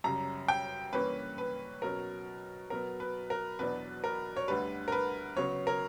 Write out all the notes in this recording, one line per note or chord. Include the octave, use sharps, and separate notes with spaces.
F#2 C#3 G3 A#5
G5
G2 E3 A#3 C#4 B4
B4
B2 F#3 C#4 A#4
B2 F#3 B3 A#4
B4
A#4
E2 B2 F#3 B3 D4 B4
A#4
C#5
D2 D3 G3 B4
A#4
B4
C#3 F#3 B3 C#5
A#4